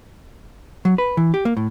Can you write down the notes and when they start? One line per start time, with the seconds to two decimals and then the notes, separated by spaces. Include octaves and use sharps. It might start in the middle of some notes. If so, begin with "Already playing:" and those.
0.85 F#3
0.98 B4
1.17 E3
1.34 G4
1.45 A#3
1.57 A2